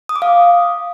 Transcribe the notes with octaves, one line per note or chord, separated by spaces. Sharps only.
D#6
D6
F5